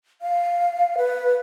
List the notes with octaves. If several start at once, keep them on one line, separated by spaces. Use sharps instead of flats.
F5
B4